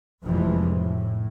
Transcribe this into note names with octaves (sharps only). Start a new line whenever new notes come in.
F1 A#1 E3 F3 G#3
A2